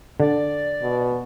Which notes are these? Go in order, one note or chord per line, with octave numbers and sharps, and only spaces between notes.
D3 D5
B2